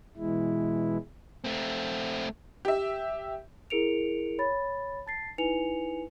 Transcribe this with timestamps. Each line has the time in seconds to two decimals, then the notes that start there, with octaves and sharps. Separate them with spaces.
0.17 B2 E3 G#3 E4
1.44 A3 C4
2.65 G4 E5
3.70 E4 G#4 A#4 C#7 D7 F7
4.38 C#5 B5 A6
5.06 A5 A6 C7
5.38 D#4 E4 B4 G#5 C#7 F7